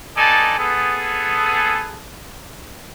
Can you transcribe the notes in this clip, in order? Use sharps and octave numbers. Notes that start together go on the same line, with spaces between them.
B3 D#4 A4 D5 G#5 A5
B3 G#4 A4